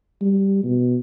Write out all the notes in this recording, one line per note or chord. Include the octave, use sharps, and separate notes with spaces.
G3
B2